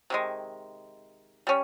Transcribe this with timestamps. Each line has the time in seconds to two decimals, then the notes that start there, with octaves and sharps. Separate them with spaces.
0.10 C3 D#3 G#3
1.47 G3 C#4